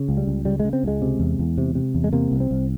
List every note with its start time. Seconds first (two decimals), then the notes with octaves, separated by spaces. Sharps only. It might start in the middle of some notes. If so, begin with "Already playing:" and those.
Already playing: C#3
0.09 C#2
0.17 G3
0.27 C#2
0.45 C#3 G3
0.60 C#3 G#3
0.73 C4
0.83 C#2 G#3
1.02 C3
1.20 E2
1.39 E2
1.58 C3
1.75 C3
1.95 E2
2.04 G#3
2.13 C3 A#3
2.32 C2
2.40 C4
2.51 C2